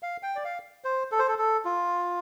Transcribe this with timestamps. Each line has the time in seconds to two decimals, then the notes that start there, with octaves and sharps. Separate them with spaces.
0.03 F5
0.23 G5
0.36 D5
0.44 F5
0.84 C5
1.12 A4
1.19 C5
1.28 A4
1.38 A4
1.65 F4